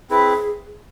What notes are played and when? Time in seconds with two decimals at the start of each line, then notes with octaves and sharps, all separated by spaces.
0.10 C4 E4 G#4 B4